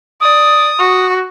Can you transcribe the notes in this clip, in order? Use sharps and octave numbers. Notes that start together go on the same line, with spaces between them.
D5 D#6
F#4